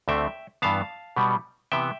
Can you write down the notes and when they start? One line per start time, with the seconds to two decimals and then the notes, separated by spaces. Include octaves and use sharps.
0.08 D2 D3 A3 C4 E5 G5
0.62 G2 E3 B3 F5 A5
1.16 B2 G3 B3
1.72 C3 E3 B3 E5 G5